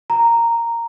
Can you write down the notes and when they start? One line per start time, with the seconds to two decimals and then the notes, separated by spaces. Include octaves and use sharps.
0.10 A#5